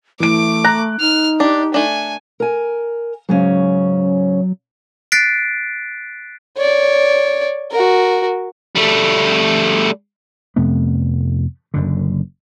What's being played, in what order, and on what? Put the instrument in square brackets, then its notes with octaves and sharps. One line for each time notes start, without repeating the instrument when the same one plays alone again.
[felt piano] E3 D7 [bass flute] A3 [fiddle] D6
[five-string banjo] A#5 [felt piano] F#6
[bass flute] D#4 [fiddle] F6
[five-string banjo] D4 [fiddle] G4
[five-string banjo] A3 D4 [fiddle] G#5
[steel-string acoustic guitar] A#4 G#5
[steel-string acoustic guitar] G#2 C#3 C#4 [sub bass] F#3
[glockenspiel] F#6 A6 B6 C7 D7
[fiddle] C#5 D5
F#4 A#4
[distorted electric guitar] G3 A3
[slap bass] F2 C3 A3 B3
F#1 F#2 D3